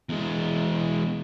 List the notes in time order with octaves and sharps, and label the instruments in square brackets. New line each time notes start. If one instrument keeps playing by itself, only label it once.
[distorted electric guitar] E2 G#3